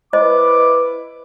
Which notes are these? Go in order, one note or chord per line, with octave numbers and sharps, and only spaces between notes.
E4 B4 C5 D#5 D6